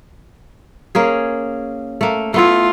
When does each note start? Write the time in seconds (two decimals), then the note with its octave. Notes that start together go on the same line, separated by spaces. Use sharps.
0.95 A#3 C#4 G#4
2.01 A3 A#3
2.34 A3 B3 E4 F4